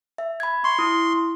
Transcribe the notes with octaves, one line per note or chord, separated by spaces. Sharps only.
E5
B5 G#6
C6 C#6
E4 D#6